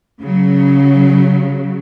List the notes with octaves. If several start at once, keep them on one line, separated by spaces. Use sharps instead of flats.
C#3 F#3